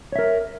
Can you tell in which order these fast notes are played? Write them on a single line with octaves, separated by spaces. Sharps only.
C#5 E5 A#4